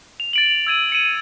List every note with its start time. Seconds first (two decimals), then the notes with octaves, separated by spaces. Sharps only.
0.20 F7
0.33 A6 D7 F#7
0.46 F#7
0.67 E6 G#6 D#7
0.92 C#7 D#7